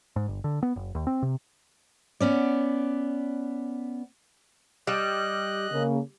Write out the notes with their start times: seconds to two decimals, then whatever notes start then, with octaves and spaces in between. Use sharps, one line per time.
0.16 G#2
0.28 G1
0.44 D3
0.63 B3
0.76 F#1
0.95 D#2
1.07 C4
1.22 C3
2.20 B3 C#4 D5
4.87 G3 D#5 F#6
5.71 C#3 A#3